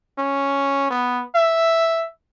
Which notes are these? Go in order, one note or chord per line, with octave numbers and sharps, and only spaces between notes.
C#4
B3
E5